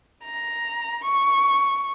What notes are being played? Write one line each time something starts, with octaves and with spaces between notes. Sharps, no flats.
A#5
C#6